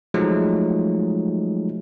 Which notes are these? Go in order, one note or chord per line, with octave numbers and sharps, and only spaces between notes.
F3 F#3 G#3 A3 D#4